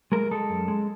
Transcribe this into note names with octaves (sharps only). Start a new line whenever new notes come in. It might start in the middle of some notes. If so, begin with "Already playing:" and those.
G#3 A#4
G#3 A4
F#2
G#3